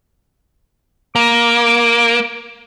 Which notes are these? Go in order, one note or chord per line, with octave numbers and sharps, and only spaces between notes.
A#3 D6